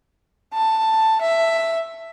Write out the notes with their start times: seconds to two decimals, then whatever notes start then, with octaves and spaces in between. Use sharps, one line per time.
0.54 A5
1.21 E5